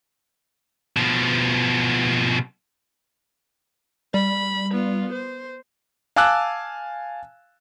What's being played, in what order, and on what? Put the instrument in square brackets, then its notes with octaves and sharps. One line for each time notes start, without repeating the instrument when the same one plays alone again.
[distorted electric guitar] B2 F3
[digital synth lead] G3 [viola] B5
[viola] B3 F4
C5
[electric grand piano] F5 G#5 A5 D6 E6 F#6